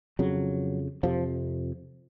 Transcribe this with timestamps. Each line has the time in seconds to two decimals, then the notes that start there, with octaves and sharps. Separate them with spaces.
0.19 F2 C#3 F#3
1.03 F2 C3 F3